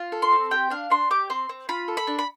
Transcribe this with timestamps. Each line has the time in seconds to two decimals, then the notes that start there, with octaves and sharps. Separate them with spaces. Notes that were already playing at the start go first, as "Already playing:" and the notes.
Already playing: F4
0.12 A4
0.22 C6
0.32 C4
0.51 G4 G5
0.70 D4 F5
0.90 D4 C6
1.10 G4 D6
1.30 C4 C6
1.49 C4
1.69 F4 B5
1.88 A4
1.97 B5
2.07 D4
2.19 B5